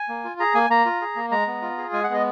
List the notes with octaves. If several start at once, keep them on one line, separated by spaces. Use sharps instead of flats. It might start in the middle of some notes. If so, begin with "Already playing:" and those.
Already playing: G#5
A#3
F4
G#4 A#5
A#3 G#5
A#3 A#5
F4
G#4
A#3
G#3 A#5
B3
F4
G#4
G#3 G#5
F#5
B3 D#5